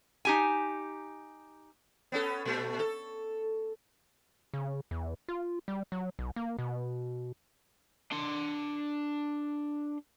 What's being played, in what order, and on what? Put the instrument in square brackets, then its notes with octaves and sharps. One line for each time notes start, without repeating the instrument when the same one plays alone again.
[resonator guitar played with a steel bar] D#4 G4 G#5
[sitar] B3 C#4 A4
A#2 A3
A4
[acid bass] C#3
E2
F4
G3
F#3
B1
A#3
B2
[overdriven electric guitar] D4 C6